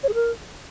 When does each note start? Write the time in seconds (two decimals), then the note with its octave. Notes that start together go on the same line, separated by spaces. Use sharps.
0.03 C#5
0.09 G#4
0.14 A#4